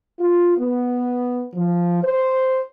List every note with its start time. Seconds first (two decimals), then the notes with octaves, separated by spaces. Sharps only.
0.20 F4
0.58 B3
1.55 F3
2.03 C5